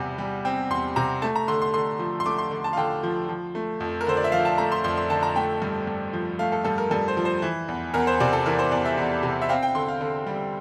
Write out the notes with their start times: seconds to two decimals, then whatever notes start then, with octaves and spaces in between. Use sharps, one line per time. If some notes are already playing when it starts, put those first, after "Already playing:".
Already playing: E2 C3 G3
0.18 G3
0.45 C4
0.70 E2 C6
0.96 C3 A#5
1.22 A3 A5
1.36 A#5
1.48 D3 C6
1.62 C6
1.74 D3 C6
1.99 F3
2.20 C6
2.26 A3 D6
2.38 C6
2.51 D3
2.64 A5
2.73 F5
2.77 D3 G5
3.03 F3
3.29 F3
3.55 A3
3.80 F2
4.01 A#4
4.07 D3 C5
4.17 D5
4.24 E5
4.32 F3 F5
4.45 A5
4.58 A3 A#5
4.72 C6
4.84 F2 C6
4.97 C6
5.10 D3 A5
5.23 A#5
5.35 A3 G5
5.62 G2
5.87 G2
6.13 F3
6.39 A3 F5
6.52 A4
6.64 G2 A4
6.78 A#4
6.91 G2 A4
7.08 C5
7.17 F3
7.25 C5
7.42 E3
7.68 E2
7.94 E2 A#4
8.07 C5
8.20 C3 D5
8.33 A4
8.46 E3 A#4
8.59 C5
8.71 E2 D5
8.85 E5
8.97 E2
9.23 C3
9.42 E5
9.49 C4 F5
9.63 G5
9.75 D3 C6
9.88 F5
10.01 D3
10.27 G3